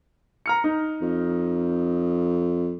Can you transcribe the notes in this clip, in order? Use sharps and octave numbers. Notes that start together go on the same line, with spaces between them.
A#5 F6 C#7
D#4
F2